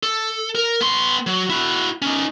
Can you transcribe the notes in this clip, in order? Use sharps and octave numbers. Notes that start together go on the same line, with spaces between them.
A4
A#4
B3 C6
F#3
E4 F#4
C#4 D#4